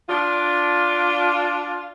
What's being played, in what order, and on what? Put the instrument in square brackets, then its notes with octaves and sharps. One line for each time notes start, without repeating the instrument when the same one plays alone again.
[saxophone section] D4 F4